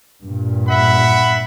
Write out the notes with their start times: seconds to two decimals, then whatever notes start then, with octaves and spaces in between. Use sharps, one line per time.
0.21 G2 A#2
0.68 E5 F#5 B5